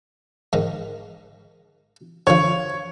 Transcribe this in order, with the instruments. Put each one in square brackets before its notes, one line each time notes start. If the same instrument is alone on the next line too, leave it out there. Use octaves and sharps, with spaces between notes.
[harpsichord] G#2 D#3
[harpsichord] D3 F3 [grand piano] C#5